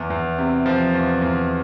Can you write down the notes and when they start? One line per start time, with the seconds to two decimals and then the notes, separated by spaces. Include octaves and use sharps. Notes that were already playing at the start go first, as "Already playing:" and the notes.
Already playing: E2
0.10 E2
0.39 C3
0.66 F3
0.94 E2
1.22 E2